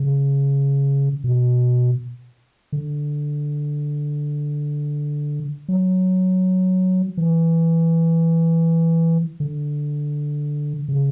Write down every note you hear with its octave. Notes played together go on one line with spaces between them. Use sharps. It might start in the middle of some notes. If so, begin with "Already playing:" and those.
Already playing: C#3
B2
D3
F#3
E3
D3
C#3